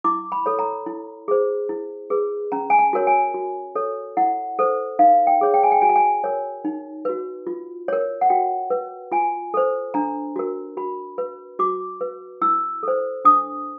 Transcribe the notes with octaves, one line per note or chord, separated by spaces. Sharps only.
E4 D6
B5
A4 C#5
A#5
E4
G#4 C5
E4
G#4 B4
C#4 A#5
G#5
A5
F#4 A#4 C#5
G#5
F#4
A4 C#5
E4 F#5
A4 C5
D#4 F5
G5
G#4 C#5
G5
G#5
G5
F#4 G#5
A5
G#5
A#4 C#5
D#4
F#4 B4
F4
A#4 C#5
F#5
F#4 G5
B4
F4 G#5
A4 C5
D4 A#5
F#4 A#4
F#4 B5
B4
F#4 D6
B4
E4 E6
A4 C5
D4 D#6